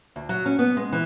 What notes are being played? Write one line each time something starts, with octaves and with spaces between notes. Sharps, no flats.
D2
F#3
C#4
B3
G#3
E3